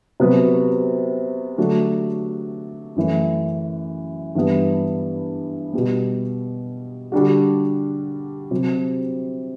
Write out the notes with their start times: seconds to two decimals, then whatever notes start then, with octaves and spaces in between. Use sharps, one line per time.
0.20 C3 F#3 B3 F#4
1.58 D3 F#3 A3 D4 F#4
2.96 F#2 E3 A3
4.35 G2 E3 G3 B3
5.73 B2 G3 B3
7.12 D3 G3 D4 F#4
8.51 C3 F#3 C4